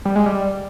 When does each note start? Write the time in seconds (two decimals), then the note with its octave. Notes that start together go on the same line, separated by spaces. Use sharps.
0.05 G3
0.16 G#3
0.26 G3